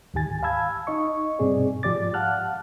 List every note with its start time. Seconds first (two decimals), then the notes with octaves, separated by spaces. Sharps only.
0.14 D2 G#2 D#3 G4 G#5 A6
0.43 F5 A5 B5 E6 G#6
0.87 D#4 D#5 C#6
1.39 G2 B2 C4 G#4 D5
1.83 G#2 F3 G4 D5 D6 A6
2.14 F5 F#5 A5 F6 F#6